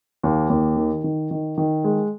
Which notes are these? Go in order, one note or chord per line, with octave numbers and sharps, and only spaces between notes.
D#2
D#2
D#3
D#3
D#3
D#3
G#3